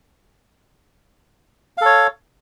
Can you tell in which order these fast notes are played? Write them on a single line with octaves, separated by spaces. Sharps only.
F5 A4 C#5